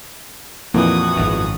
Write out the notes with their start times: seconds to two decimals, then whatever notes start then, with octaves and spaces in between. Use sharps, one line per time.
0.74 F2 A#2 E3 A#3 F#4 D#6
1.17 G#1 F#2